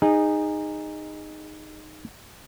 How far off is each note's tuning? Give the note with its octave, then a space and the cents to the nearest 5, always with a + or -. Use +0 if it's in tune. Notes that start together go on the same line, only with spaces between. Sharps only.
D#4 -10 G#4 -25